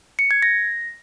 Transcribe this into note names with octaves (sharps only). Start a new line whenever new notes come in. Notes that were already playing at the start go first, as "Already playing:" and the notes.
C#7
G#6
A#6